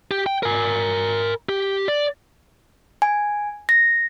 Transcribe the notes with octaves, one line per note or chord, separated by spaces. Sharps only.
G4
G5
A#4 G#5
G4
D5
G#5
A#6